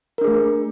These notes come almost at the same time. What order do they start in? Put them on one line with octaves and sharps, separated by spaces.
A#4 D4 G#4 A3